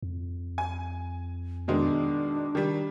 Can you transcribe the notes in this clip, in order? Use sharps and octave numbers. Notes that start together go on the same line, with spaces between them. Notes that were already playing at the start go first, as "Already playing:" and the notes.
F2
G#5
B2 D#3 G#3 D4
D#3 G3